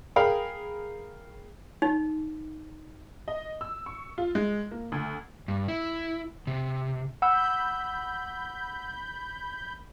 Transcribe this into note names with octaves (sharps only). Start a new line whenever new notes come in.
G#4 A#4 F5 G5 B5
D#4
D#5
E6
C#6
F4
G#3
A#3
D2
G2
E4
C3
F#5 B5 E6 G6